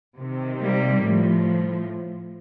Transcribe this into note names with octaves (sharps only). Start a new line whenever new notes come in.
C3 D#3
G3 A#3
A2 F3